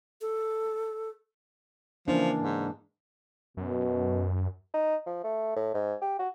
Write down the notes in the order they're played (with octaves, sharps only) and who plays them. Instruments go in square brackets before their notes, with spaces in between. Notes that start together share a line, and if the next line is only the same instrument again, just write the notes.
[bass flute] A4
[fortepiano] C#3 E3 A#3 [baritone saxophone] F3 [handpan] D4
[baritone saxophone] G#2
[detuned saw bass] F#2 [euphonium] B2
[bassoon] D#4
F3
A3
A2
G#2
G4
F#4